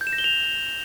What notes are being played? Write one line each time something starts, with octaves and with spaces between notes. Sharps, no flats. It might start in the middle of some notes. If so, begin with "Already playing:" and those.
G6
E7
A#6
G7
F7